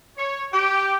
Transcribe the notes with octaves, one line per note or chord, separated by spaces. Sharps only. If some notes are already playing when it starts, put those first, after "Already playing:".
C#5
G4